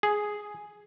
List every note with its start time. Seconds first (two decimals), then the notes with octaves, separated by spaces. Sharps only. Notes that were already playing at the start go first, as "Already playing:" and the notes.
0.03 G#4